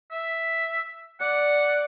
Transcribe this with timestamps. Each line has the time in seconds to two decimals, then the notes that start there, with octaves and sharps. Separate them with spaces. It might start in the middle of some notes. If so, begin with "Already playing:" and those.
0.11 E5
1.21 D5 F#5